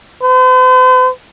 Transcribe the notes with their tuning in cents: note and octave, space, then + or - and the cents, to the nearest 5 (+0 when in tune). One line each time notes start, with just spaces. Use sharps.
C5 -45